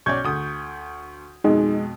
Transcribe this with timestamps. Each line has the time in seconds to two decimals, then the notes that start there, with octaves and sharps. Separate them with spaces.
0.06 B1 C#4 D5 C#6 G6 G#6
0.24 D2 D#6
1.44 F2 B2 G#3 D#4 G#4 D#5